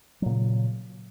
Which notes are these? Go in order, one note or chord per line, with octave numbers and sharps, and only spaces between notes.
A#2 C#3 F#3